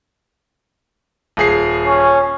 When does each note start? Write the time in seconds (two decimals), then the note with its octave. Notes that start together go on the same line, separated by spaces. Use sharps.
1.37 D#1 G#4 C7
1.86 C#4